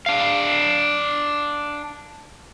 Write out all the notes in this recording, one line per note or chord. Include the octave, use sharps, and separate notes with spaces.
D4 F5